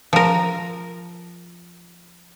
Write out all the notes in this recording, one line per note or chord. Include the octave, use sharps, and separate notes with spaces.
F3 A#4